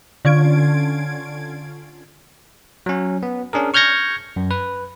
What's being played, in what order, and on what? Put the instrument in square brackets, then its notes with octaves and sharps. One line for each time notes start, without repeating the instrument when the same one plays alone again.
[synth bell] D3 C#4 F4 G#6 D7
[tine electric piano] F#3 C#4
B3
C#4 D4 G#4 A#4
C#6 F6 G6 G#6 A#6 C#7
F#2
B4